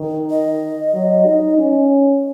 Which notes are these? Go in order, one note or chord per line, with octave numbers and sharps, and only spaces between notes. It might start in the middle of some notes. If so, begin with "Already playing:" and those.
Already playing: D#3
D#5
F#3
D#4
C#4